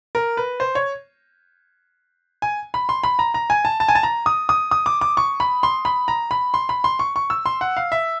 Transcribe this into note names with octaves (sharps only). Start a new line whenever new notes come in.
A#4
B4
C5
C#5
G#5
B5
C6
B5
A#5
A#5
G#5
A5
A5
G#5
A5
A#5
D#6
D#6
D#6
D6
D6
C#6
B5
C6
B5
A#5
B5
C6
B5
C6
C#6
C#6
E6
C6
F#5
F5
E5